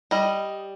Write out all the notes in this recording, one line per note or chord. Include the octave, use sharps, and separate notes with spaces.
G3 D#5